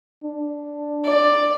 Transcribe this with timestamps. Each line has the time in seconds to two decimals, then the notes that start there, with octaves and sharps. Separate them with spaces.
0.24 D4
1.05 D5